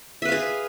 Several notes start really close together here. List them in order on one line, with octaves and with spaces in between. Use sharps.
E5 B4 F5 G#4